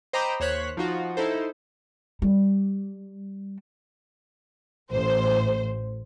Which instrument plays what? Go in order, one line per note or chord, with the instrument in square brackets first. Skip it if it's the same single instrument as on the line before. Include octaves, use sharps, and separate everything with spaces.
[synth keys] C5 D#5 G5 A#5 B5 D6
D#2 C5 C#5 F#6 B6
F3 D#4 F4 F#4
D#4 E4 A4 C5
[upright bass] G3
[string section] A1 C5